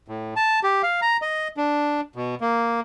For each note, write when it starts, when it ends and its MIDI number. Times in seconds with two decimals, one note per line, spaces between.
0.08 0.34 45
0.36 0.60 81
0.64 0.82 67
0.83 1.00 77
1.02 1.17 82
1.22 1.48 75
1.57 2.01 62
2.16 2.35 47
2.41 2.80 58